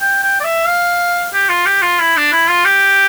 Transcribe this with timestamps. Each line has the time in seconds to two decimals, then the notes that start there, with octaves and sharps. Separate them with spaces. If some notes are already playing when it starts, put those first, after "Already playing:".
0.01 G5
0.23 G5
0.40 D5
0.44 E5
0.68 F5
1.34 G4
1.49 F4
1.66 G4
1.82 F4
2.00 E4
2.16 D4
2.32 E4
2.49 F4
2.65 G4